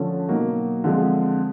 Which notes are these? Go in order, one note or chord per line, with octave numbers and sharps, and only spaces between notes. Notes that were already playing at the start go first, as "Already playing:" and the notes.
Already playing: D3 F3 A3 C#4
B2 F#3 A#3 D#4 F#4
D3 F3 G#3 C4 F4